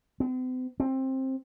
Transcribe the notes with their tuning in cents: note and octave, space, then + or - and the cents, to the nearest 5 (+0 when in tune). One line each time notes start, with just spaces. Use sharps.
C4 -45
C4 +15